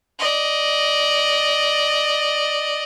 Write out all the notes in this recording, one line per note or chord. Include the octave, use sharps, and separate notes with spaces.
D5 D#5